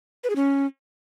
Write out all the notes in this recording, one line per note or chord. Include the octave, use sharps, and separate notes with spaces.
B4
G#4
C#4